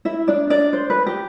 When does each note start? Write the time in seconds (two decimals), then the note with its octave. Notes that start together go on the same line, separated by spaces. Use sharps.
0.05 E4 E5
0.28 D4 D5
0.50 D4 D5
0.73 C5
0.90 B4
1.06 G4